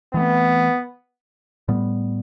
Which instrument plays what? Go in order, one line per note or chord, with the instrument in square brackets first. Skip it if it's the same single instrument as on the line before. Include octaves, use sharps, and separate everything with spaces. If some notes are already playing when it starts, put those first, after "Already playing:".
[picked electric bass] E3 A3 C4 [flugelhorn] B3
[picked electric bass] A2 G3 B3